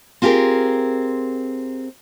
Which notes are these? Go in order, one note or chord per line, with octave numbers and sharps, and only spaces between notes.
C4 F4 G4 G#4 A#4